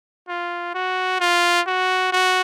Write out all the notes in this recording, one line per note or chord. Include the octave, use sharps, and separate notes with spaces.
F4
F#4
F4
F#4
F#4